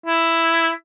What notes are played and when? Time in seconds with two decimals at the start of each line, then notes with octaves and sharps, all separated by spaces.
0.06 E4